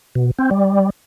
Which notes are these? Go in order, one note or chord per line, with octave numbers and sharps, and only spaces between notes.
B2
C4
G3